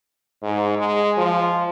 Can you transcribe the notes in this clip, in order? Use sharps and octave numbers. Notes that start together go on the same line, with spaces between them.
G#2
G#3
F3